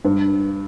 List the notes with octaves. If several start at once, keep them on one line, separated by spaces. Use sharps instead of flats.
G2